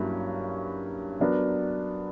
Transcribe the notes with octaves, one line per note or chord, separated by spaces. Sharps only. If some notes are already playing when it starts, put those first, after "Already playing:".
Already playing: G2 F#3 A#3 C#4 E4
F#3 B3 D4 A#4